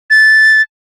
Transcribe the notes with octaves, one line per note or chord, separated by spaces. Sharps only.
A6